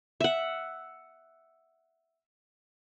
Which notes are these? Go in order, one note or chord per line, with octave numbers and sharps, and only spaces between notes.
E5 F#5